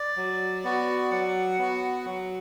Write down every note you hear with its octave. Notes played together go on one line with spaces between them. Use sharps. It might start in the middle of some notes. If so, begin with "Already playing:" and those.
Already playing: D5
F#3
B3 F#4
F#3 F#5
B3 F#4
F#3